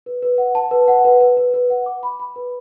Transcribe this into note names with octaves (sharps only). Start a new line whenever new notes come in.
B4
B4
F#5
A5
B4
F#5
B4
B4
B4
B4
F#5
D6
B5
B5
B4